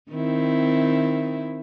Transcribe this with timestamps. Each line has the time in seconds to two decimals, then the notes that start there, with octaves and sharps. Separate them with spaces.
0.11 D#3 C4 E4